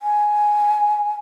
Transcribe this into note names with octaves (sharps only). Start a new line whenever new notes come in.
G#5